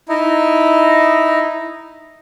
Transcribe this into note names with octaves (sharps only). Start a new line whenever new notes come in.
D#4 E4